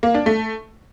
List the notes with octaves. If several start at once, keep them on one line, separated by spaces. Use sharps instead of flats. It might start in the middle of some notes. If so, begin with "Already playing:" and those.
A#3
D4
A3